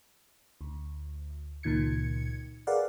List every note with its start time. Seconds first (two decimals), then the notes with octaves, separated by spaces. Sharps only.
0.61 D2
1.63 C#2 A#2 D#3 G#6 C#7
2.67 G#4 A#4 B4 D5 F5 F#5